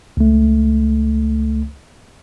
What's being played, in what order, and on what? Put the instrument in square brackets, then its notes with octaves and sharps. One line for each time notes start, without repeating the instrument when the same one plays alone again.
[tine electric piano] C#2 A3